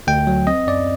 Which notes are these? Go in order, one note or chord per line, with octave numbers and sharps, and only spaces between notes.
D2 G5
F#3
C4 D#5
F#2 D5